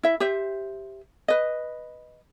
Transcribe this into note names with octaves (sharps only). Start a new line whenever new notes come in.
E4 E5
G4 C5 E5
B4 D#5